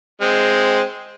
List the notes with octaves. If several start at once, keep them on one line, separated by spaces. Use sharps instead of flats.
G#3 C4